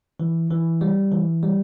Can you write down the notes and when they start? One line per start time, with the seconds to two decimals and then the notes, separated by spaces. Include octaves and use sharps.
0.20 E3
0.50 E3
0.81 G3
1.12 E3
1.43 G3